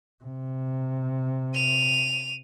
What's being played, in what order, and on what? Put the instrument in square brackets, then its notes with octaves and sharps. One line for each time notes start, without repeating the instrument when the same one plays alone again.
[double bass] C3
[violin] D#7 F7